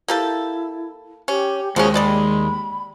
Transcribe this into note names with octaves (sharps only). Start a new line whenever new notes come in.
A#3 E4 G4 A4
C#4 G4
D#2 F3 F#3 G#3 C#4 G#4
G3 D5 D#5 B5